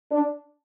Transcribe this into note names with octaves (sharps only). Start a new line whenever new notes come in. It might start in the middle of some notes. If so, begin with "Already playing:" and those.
D4